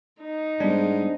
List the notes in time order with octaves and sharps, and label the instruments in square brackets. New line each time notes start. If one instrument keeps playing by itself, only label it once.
[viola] D#4
[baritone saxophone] G#2 [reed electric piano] G3 B3 [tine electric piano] D4